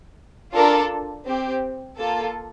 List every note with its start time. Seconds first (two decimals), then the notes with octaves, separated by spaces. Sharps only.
0.54 D4 F4 A4 A#4
1.26 C4 G4
1.97 A#3 F4 A4